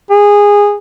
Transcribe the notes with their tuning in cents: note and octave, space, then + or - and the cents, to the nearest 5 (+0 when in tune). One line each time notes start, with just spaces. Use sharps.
G#4 -20